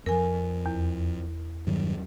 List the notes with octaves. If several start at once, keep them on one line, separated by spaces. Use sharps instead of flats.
F2 F3 A#4 G#5
E2
G2 D#3 F#3